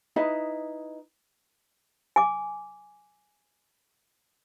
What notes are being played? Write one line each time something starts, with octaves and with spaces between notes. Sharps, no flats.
D#4 E4 B4 D#5
G#5 D6